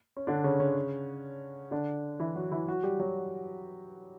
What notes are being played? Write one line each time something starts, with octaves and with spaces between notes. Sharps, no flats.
C#4
D3 D4
C#3 C#4
C#3 C#4
D3 D4
E3 E4
F#3 F#4
E3 E4
F#3 F#4
G3 G4
F#3 F#4